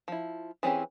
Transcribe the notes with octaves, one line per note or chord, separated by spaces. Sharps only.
F3 E4
E3 C4 C#4 G4 G#4